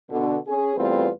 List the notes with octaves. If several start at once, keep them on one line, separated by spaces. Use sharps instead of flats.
B2 D3
C#4 G#4
E2 G3 A3 C4 F4 B4